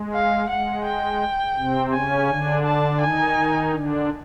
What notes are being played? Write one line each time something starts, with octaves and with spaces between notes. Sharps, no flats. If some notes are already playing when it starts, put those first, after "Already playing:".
Already playing: G#3
F5
G#3 F#5
G5
C3 C4
C#3 C#4 G#5
D3 D4
A5
D#3 D#4 G#5
D3 D4